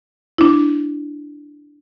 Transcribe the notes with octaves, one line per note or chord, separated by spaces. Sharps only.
D4 E4